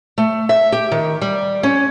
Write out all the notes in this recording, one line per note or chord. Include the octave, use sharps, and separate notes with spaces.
A3
E5
G4
D#3
G3
C#4